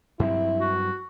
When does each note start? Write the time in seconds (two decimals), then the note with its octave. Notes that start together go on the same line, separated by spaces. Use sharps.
0.20 G2 F#3 C4 E4
0.60 F#4